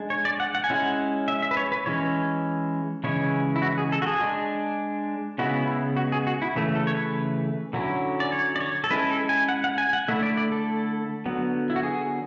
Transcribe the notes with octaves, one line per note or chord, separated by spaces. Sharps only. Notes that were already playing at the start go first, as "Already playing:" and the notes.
Already playing: G#3 D4
C#5
D5
F#5
F#5
G#5
G#3 C#4 E4 F#5
E5
E5
B4
C#5
B4
E3 G#3 C#4 C#5
C#3 E3 G#3 C#4 E4 C#5
E4
F#4
G#4
A4
F#4
G#4
G#3 D4
C#3 G#3 B3 E4 F#4
E4
F#4
G#4
F#4
E4
C#3 E3 A3
A4
C#5
B4
D3 F#3 C#4 E4
D5
C#5
D5
C#5
A4
G#3 C#4 E4 B4
A4
G#5
F#5
F#5
G#5
F#5
D3 A3 E4 E5
D5
D5
A4
D3 F#3 B3
E4
F#4
G#4